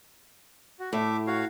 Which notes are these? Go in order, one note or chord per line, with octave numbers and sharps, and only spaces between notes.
F#4
A2 A3 E5 D6
F#4 C#5 F5